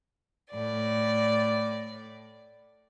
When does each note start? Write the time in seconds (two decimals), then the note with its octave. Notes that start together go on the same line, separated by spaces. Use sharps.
0.50 A2 D5